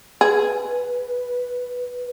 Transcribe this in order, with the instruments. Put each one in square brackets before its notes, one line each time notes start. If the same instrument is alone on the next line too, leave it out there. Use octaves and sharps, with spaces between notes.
[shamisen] G#4 [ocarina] B4